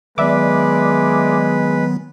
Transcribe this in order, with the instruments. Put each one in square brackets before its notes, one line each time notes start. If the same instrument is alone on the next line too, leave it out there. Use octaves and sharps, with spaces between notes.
[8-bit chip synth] D#3 F#3 B3 [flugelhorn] G#3 [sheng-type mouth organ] B4 [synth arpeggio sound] D5 E5 D6